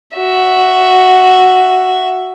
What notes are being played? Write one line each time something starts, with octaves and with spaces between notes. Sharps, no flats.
F#4 E5